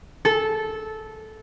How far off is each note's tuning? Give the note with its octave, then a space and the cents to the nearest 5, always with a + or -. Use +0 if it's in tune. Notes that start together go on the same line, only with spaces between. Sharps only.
A4 -15